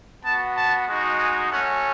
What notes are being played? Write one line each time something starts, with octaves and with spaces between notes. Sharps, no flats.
B3 F#4 A5
A5
G#3 D#4 F#4
G#5
A3 C#4 F#4 F#5